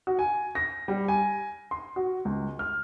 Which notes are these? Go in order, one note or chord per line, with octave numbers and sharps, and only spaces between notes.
F#4
G#5
A#6
G3
G#5
C6
F#4
C#2
F6